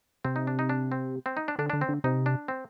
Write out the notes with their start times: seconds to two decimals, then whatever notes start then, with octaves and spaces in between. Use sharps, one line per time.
0.25 C3 C4
0.36 D#4
0.47 D4
0.59 D#4
0.69 D4
0.92 C4
1.26 C4
1.37 D#4
1.48 D4
1.59 D3 D4
1.70 D3 D4
1.81 C4
1.89 D3
2.04 C3 D#4
2.26 D4
2.48 C4